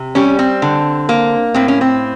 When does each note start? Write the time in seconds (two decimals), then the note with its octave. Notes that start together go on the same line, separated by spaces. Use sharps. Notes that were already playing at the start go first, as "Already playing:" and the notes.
Already playing: C3
0.15 G3 C#4
0.39 C4
0.62 D3
1.09 A#3
1.54 A2 C4
1.68 C#4
1.81 C4